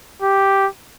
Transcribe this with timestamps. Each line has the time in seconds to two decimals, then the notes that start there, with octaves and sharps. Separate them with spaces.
0.22 G4